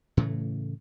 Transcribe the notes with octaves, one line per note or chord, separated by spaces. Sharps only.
A2 C#3 E3 A3